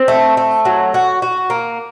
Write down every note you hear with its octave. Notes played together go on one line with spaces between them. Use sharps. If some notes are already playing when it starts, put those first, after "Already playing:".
Already playing: C4
A3
A3
F#3
F#4
F#4
A#3